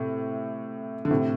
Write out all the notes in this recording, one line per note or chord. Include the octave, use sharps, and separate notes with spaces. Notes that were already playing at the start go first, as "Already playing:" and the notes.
Already playing: A2 C3
D3
A2 C3